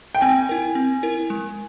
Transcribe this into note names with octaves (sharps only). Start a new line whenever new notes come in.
G5
C4 G#5
E4 A#4
C4
E4 A#4
G#3